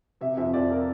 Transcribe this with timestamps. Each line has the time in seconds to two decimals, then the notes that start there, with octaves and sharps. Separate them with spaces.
0.21 C3 E5
0.37 F2 E5
0.53 F2 D5
0.70 F3 A#4